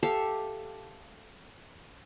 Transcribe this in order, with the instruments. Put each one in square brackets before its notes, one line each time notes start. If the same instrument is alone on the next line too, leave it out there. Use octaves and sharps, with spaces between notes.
[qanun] G4 A4 E5 F5